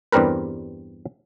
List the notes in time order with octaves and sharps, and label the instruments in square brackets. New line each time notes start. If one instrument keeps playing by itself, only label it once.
[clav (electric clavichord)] E2 G2 G3 C4 A#4 B4